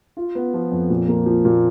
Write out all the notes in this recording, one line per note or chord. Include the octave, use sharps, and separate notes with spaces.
F4
B3
F3
F2
A#2
A#3
F3
A#2